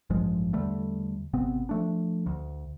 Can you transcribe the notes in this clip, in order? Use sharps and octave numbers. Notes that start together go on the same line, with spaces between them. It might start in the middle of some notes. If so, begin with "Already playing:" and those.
A1 G2 F3 G#3
E2 D3 G3 A3
G#1 C3 B3 C4
F3 A3 D4
D2